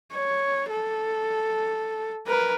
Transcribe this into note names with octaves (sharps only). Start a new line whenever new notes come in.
C#5
A4
A#4 B4